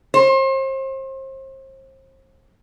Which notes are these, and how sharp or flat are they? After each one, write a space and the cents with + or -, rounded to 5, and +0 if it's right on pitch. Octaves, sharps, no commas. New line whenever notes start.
C5 +35